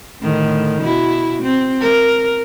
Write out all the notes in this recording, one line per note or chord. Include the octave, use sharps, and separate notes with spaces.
A2 D3 D#3
B2 E4 F#4
C4
A#4